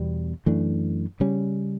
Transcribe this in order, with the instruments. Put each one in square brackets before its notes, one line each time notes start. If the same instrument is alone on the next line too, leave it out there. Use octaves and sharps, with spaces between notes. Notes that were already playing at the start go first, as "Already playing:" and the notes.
Already playing: [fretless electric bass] E2 B2 G3
F#2 E3 A3 D4
C#3 G3 C#4